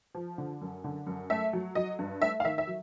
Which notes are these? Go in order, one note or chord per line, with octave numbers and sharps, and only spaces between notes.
F3
D3
F#2
D3
F#2
A3 E5
F#3
F#3 D#5
G2
A3 E5
F5
D#3 E5
E5
F#3